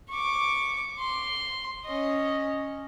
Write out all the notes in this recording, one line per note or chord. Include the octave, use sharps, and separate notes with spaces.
C#6 D6
C6
C#4 D#5